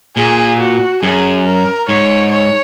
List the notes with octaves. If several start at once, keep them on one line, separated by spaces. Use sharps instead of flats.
A#2 G#4
F#4
F#2 G#4
A#4
G#2 C#5
C#5